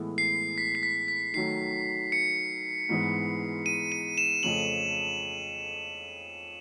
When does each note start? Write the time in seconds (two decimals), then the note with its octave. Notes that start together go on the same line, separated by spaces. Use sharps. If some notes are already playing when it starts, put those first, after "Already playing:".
Already playing: A2 E3 G#3 B3
0.18 C7
0.58 B6
0.75 C7
0.83 B6
1.08 B6
1.34 D#3 F#3 A3 C7
2.12 C#7
2.89 G#2 E3 G#3 B3
3.66 D#7
3.92 D#7
4.18 E7
4.43 F2 C#3 F3 A3 C#4 F#7